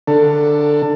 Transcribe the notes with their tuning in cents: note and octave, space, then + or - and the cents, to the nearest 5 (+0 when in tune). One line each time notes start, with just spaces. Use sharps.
D3 +0 A4 +20